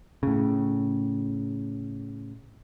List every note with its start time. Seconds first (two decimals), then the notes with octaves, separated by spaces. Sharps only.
0.23 A2 C#3